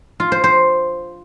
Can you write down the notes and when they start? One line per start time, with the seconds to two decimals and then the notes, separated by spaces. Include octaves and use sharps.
0.20 F4
0.32 C5
0.44 C5